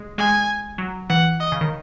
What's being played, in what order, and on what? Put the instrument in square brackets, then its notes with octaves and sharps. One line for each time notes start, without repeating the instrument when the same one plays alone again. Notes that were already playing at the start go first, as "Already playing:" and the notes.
Already playing: [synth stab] G#3
[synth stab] G#3 [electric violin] G#5
[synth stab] F#3
[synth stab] E3 [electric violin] F#5
[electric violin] D#5
[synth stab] C#3
D#3